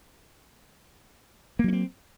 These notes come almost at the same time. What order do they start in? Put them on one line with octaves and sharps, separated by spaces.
A#3 F#3 C#4 C4